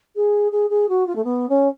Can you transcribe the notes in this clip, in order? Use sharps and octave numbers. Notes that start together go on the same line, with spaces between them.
G#4
G#4
G#4
F#4
F4
A3
B3
C#4